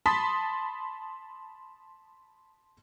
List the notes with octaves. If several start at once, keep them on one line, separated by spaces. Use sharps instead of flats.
A5 B5 C6 D#6 A6 B6